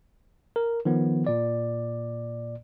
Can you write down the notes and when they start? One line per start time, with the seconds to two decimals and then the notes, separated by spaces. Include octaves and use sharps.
0.56 A#4
0.85 D#3 F3 B3
1.27 A#2 D5